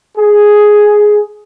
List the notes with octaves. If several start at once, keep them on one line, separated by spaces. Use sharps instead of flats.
G#4